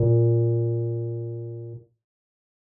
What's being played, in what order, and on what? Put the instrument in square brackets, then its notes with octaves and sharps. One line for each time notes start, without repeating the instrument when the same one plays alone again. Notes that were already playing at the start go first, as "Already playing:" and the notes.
Already playing: [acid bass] A#2